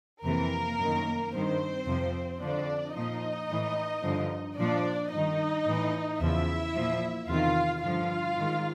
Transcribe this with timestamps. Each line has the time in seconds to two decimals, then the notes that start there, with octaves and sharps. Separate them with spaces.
0.23 F2 C3 E3 A#3 A#4
0.79 F#2 D#3
1.32 G2 D#3 C4 C5
1.86 F2 C3 F3
2.41 F2 D3 F3 D4 D5
2.95 A#2 F3 D#4 D#5
3.49 A2 E3
4.03 G2 D3 F3
4.57 A#2 F3 D4 D5
5.12 G2 D#3 D#4 D#5
5.66 A2 E3
6.20 E2 C#3 F3 E4 E5
6.74 A#2 F3
7.29 E2 C3 D#3 F4 F5
7.83 G2 D3 F3 F4 F5
8.37 G#2 D#3